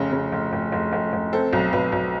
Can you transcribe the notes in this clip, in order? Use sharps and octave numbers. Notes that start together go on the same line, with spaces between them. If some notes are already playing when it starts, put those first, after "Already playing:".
Already playing: F1 C#3
C#3
F1
F1
F1
F1
F1
C4 A4
B1
B1 B4
B1